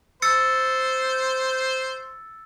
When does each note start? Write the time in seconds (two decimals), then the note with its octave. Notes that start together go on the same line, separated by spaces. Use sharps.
0.22 C5 E6 A6 C#7